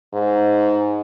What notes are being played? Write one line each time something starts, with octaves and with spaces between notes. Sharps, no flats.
G#2